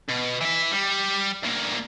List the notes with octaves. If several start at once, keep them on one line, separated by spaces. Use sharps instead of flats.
B2
E3 E5
G3
D2 A#3